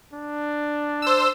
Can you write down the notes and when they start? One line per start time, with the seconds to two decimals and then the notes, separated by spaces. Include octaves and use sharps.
0.14 D4
1.02 C5 E6